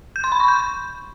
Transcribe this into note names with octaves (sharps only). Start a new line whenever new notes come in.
G6
C6
B5
C#6
G6